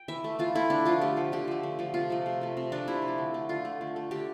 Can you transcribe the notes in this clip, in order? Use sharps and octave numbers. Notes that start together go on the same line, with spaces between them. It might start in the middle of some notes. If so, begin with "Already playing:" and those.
Already playing: G5
E3 E5
A3
E3 F4
A3 E4
D3 D4
F3 A3 F4
D3 G4
F3 A3
D3 G4
F3 A3
D3
F3 A3
C3 F4
F3 A3
C3
F3 A3
C3
F3 A3 D4
C3 E4
F3
A3
D3
A3
D3 F4
A3
D3
A3
D3 G4